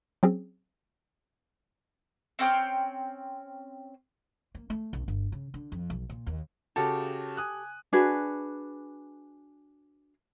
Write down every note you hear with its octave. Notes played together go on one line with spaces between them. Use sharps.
F#3 C4 C#4 G#4
C4 C#4 G5 F6
A#3
A3
B1
G1
C#3
D3
F2
B1
A#2
D#2
C#3 F#4 G4 A4 A5
G#5 D#6 F#6
D4 F#4 G#4 B4